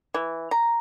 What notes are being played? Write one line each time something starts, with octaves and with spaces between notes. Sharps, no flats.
E3
A#5